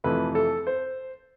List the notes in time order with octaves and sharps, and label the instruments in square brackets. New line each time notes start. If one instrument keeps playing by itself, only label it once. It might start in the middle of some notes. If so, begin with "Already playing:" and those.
[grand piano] F2 C3 E3 A3 B4
A4
C5